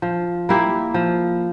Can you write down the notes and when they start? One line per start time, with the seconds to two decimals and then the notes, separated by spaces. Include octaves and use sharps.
0.02 F3
0.49 A#3 E4 G4
0.94 F3